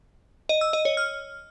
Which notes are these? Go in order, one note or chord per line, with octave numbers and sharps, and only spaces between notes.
D#5
E6
D#5
C#5
F6